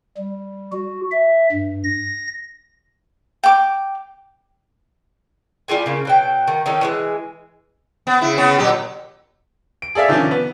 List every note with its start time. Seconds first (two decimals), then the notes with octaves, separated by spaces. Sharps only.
0.17 G3
0.72 F#4
1.11 E5
1.52 G2
1.84 A#6
3.44 G5 D6
5.68 G3 F4 G#4 G#5
5.86 C#3 A#3 C#4
6.05 B2 F#3 G5
6.48 D#3
6.66 D#3 C#4 D#4 A4
6.81 E3 G3 G#3
8.07 B3
8.21 C#3 E4
8.38 C#3 B3 C#4
8.58 A#2 F#3 G4
9.82 D7
9.95 G#4 A4 D5 E5 F5
10.08 C3 D#3 F3 C#4 D4
10.31 B3